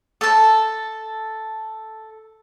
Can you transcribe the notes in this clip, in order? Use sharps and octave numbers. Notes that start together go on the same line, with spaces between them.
A4 A5